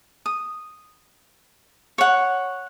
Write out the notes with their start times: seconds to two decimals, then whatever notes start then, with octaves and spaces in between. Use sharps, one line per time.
0.26 D#6
1.98 C#5 F#5